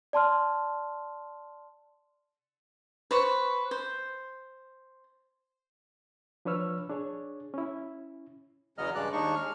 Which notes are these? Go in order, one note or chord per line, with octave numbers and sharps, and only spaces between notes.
D5 A5 C6 F6
B4 C5 C#6
C5
F3 D4 B4 C#5 E6 F6
D4 G#4 C#5
C#4 E4
E2 C#3 F#3 B3 D#5 F6
G2 C#3 G#3 D5 F#6
D#2 G#3 D4 D#4 C#6
G#3 F6